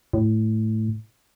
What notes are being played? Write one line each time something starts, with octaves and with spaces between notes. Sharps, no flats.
A2